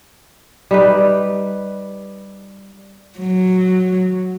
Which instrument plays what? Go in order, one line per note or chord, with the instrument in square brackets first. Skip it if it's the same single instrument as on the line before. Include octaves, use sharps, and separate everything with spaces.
[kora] G3 D#4 B4
[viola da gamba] F#3